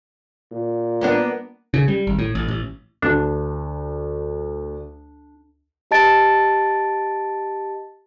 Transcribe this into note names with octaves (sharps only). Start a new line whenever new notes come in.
A#2
A#3 B3 D4
C#3
G3
G#1
A2
A1
A1
D2 D4
G4 D#5 A5 A6 D7